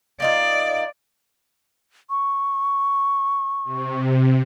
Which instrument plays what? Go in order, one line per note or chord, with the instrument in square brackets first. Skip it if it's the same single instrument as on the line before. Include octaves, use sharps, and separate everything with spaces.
[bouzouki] A#3 D#4 F4 [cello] D5
[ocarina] C#6
[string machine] C3